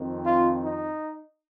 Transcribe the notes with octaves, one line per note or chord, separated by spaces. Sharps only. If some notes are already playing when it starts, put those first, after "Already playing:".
Already playing: F2 D#3 C4
F4
D#4